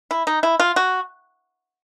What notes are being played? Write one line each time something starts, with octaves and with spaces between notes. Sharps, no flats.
E4
D#4
E4
F4
F#4